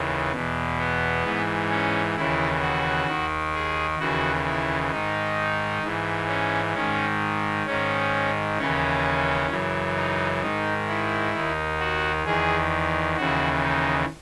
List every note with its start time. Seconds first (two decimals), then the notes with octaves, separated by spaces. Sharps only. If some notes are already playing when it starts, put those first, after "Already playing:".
Already playing: D#2 C#3 E3
0.32 E2 B2
0.78 B3
1.24 G#2 E3
1.70 C#4
2.16 D#2 C#3 E3 E4
2.62 F#4
3.07 D#2 D#3
3.54 G#4
3.99 D#2 C#3 E3 F#4
4.45 E4
4.91 G#2 D#3 D#4
5.82 G#2 E3
6.29 C#4
6.74 G#2 D#3 C#4
7.66 G#2 D#3 C#4
8.58 D#2 C#3 E3 C#4
9.50 F#2 C#3 E3
9.96 D#4
10.41 G#2 D#3 D#4
10.87 E4
11.33 D#2 D#3
11.80 F#4
12.25 E2 D#3 G#4
13.17 D#2 C#3 E3 F#4
13.63 D#4